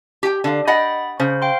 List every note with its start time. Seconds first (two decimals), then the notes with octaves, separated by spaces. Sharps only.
0.23 G4 G5
0.44 D3 F5
0.67 D#5 F#5 G5 B5 A6
1.20 C#3 C5
1.42 F5 G5 C6